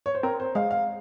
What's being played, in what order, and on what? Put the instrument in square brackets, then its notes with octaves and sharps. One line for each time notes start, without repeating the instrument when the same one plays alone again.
[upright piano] C#5
C5
[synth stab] C4 [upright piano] A#4
[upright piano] C5
[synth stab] G#3 [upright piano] F5
[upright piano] F5